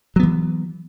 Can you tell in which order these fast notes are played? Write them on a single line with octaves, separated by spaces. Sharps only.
F#3 B3 E3